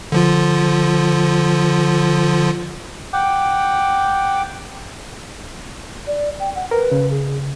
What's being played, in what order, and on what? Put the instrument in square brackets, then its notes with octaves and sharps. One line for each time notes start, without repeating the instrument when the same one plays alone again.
[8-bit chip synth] D3 F3 F4
[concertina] F#5 G5 D6
[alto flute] D5
G5
F#5
[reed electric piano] A#4 [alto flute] B4
[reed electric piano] C#3
[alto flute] G#4